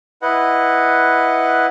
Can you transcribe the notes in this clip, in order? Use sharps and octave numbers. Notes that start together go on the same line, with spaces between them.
E4 B4 D#5 F#5